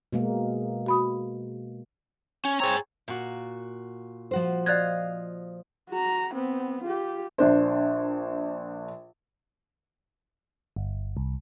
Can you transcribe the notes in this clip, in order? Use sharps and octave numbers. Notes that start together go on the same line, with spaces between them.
B2 G#3 A#3
F#4 B5 D#6
C#4
C4 G#4 C#5 A#5
A#2 F#4
F3 F#4 C5
D5 D#5 F5 F#6 G#6
F#4 A#5
B3 C4
F4 G4
A#1 D4 C5
G1
C2